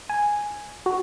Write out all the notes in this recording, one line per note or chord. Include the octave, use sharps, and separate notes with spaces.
G#5
F#4